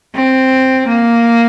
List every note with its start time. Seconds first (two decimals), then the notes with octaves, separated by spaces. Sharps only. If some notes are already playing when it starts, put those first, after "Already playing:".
0.15 C4
0.88 A#3